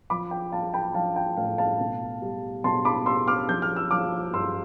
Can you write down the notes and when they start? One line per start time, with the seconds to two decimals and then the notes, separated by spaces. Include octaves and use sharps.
0.10 F3 B5 D6
0.31 G5
0.52 F3 F5 A5
0.74 G5 B5
0.94 F3 F5 A5
1.16 G5
1.37 A2 F5
1.58 F5 A5
1.80 B2
2.22 G3
2.64 B2 A5 C6
2.85 B5 D6
3.06 G3 C6 E6
3.27 D6 F6
3.49 F3 G6
3.62 F6
3.76 E6
3.91 F3 D6 F6
4.33 G2 C6 E6